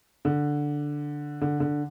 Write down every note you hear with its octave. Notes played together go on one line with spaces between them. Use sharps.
D3
D3
D3